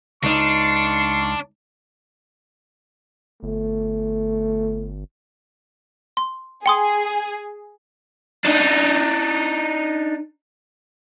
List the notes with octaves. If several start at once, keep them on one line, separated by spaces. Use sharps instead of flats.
C#2 D4 D#4 F5 C6 C#6
G1 A3
C6
G#4 G5 C6 D#6
D4 D#4